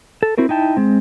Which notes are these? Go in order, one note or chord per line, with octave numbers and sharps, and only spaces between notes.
A4
C4 E4 F#4 A#4
D#4 E4 G5 A5
G#3 C4